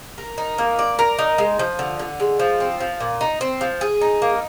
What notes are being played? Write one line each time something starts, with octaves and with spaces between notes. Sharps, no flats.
A#4
D#4
A#3
D5
A#4
D#4
G#3
F3
D3
D3
G#3
F3
C4
F3
A#2
D#4
C4
F3
G#4
D#4
A#3